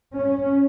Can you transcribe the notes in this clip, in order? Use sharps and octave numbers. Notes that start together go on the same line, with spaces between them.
G2 C#4